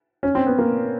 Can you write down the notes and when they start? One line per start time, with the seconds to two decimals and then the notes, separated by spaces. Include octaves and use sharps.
0.23 C#4
0.35 C4
0.46 B3
0.58 A#3